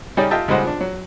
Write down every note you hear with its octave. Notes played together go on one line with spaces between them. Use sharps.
C#3 G3 C#4 D#4 G4 D5
F4 G4 D#5 E5 G5 A5
C#2 G#2 G3 C5 D#5 F#5
F3 D4
F#3